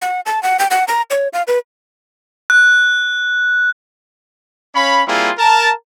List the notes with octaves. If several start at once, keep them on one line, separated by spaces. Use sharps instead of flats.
F#5
A5
F#5
G5
F#5
A#5
C#5
F5
B4
F#6
C#4 C#5 F5 B5
G3 A#3 C4 E4 F4 G#4
A#4 A5